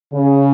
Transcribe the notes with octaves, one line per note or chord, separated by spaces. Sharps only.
C#3